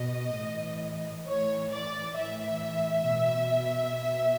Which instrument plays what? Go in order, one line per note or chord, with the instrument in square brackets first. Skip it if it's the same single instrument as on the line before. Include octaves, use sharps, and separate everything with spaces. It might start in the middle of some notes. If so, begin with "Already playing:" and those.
Already playing: [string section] B2 D#5
A2 E3
A2 E3 C#5
D5
A2 E3 E5
B2
B2